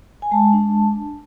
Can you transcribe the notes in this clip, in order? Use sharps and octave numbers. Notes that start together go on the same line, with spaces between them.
G#5
G#3 A5
D4